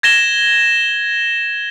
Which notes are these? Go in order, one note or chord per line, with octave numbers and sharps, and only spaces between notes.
G#6 A#6 E7 G7